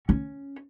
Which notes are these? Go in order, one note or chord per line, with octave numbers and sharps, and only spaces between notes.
C#4